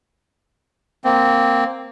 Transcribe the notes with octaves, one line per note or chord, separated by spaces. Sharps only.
A#3 C4